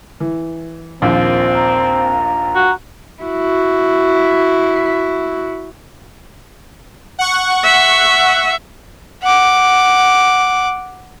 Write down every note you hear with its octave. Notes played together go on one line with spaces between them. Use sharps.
E3
A#1 D#2 F3 C4
A#5
F#4
E4 F#4
F#5 C#6
E5
F#5 D6